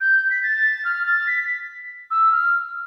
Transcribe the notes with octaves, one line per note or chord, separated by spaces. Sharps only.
G6
B6
A6
F6
A6
B6
E6
F6